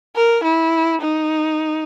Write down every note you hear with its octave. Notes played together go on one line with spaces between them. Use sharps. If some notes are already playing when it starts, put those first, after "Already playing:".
A#4
E4
D#4